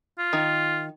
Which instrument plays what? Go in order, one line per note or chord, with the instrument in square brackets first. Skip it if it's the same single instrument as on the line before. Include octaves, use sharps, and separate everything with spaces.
[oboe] F4
[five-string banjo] D#3